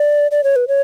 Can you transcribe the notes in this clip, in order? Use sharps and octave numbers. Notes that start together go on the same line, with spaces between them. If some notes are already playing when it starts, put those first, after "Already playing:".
Already playing: D5
D5
C#5
B4
C#5